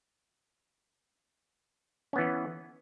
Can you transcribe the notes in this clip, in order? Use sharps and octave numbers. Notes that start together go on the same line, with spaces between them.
E3 B3 C#4